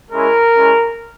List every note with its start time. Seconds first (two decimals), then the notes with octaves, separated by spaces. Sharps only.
0.11 G#3 C#4 E4 A#4
0.54 G#3 C#4 E4